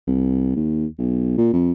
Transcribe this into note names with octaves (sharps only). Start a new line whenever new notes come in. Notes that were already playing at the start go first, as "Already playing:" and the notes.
C2
D#2
B1
A#2
F2